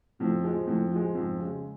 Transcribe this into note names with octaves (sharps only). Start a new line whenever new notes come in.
F2 A2
F3 G#3
F2 A2
F3 G#3
F2 G#2
C#3 G#3